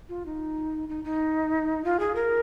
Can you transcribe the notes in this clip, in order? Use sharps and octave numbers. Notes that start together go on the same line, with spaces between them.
F4
D#4
D#4
D#4
F4
G#4
A#4